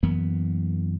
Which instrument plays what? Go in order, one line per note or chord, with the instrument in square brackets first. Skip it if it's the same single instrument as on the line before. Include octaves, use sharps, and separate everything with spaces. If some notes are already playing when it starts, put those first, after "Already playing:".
[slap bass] F#2 E3 A#3 B3